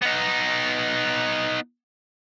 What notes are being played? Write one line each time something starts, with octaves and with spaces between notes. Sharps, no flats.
B3 D#4